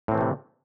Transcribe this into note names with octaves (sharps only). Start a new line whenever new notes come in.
A2 C3 E3 A3 C4